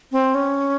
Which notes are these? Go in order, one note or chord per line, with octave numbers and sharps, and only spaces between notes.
C4
C#4